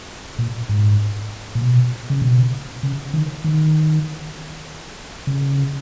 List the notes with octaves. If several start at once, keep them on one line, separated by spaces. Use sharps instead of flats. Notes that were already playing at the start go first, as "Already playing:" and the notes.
A#2
G#2
A#2
B2
C#3
B2
C#3
D#3
D#3
C#3